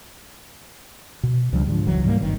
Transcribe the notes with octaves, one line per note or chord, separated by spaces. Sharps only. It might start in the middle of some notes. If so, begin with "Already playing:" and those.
B2
C#2 F3 G3 D4
G#2 D3 F3
F#1 C#2 E3 F#3
G#2 G3 A3 A#3
G#1 G2 D#3